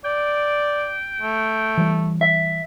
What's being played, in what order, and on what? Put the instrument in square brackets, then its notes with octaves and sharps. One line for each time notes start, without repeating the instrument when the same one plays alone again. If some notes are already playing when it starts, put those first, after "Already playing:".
[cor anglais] D5 [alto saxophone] G5
[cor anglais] A3
[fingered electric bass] E3 G3
[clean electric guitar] E5